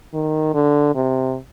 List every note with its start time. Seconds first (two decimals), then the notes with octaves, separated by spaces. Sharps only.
0.14 D#3
0.54 D3
0.95 C3